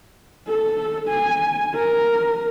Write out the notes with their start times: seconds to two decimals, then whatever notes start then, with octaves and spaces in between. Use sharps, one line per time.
0.48 A4
1.08 G#5
1.74 A#4